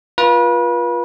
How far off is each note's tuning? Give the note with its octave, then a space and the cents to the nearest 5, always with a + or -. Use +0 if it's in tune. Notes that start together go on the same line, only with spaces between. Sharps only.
F4 +0 B4 -35